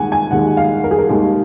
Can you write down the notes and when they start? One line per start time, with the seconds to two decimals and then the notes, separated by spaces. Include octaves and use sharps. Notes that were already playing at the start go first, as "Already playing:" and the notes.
Already playing: D#2 D#3 G#3 F#5 G#5
0.12 G#5
0.31 D#2 D#3 G#3 F#5
0.57 F5
0.84 A#4
0.91 G#4
0.98 A#4
1.09 D#2 D#3 G#3 G#4